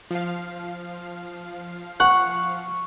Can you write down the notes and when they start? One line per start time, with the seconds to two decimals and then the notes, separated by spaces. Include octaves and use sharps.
0.11 F3 F5
2.00 F#5 C#6